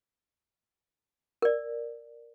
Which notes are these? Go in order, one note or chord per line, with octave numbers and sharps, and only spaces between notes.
A#4 D5